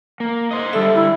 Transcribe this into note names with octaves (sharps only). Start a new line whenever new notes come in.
A#3
C5 D#5
D3 G3 A4 E5
E4